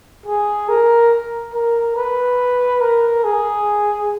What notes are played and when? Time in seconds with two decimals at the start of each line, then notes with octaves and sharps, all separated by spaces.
0.26 G#4
0.69 A#4
1.54 A#4
1.96 B4
2.81 A#4
3.24 G#4